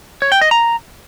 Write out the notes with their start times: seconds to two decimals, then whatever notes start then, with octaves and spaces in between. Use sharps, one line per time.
0.22 C#5
0.32 G5
0.41 D#5
0.51 A#5